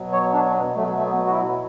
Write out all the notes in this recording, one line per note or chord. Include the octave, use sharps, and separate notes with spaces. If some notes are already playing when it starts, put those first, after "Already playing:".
Already playing: B2 F#3
C#5
D4
B3
B2 F#3 A3
A3
B3
F#4
E4